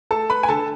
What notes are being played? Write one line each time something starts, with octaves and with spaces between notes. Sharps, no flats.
A3 A4 A5
B4 B5
G#5
D3 A4 A5